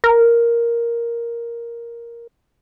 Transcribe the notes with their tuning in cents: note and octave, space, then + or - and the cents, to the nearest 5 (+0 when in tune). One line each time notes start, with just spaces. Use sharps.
A#4 +5